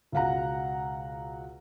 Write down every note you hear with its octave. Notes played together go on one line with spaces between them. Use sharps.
C#2 B2 F5 F#5 A#5